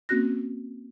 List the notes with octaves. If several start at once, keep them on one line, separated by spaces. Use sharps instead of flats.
A#3 C4 C#4 F#4 F#6 A#6